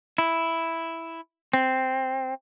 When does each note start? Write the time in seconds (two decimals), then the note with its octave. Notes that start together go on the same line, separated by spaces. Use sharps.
0.18 E4
1.53 C4